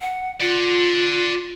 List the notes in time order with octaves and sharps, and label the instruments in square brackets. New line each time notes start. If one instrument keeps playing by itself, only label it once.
[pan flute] F#5
[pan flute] F4 [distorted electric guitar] D5 F#5